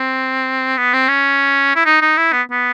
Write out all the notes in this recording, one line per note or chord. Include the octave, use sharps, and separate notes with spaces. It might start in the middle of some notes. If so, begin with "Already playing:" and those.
Already playing: C4
B3
C4
C#4
E4
D#4
D#4
E4
B3
B3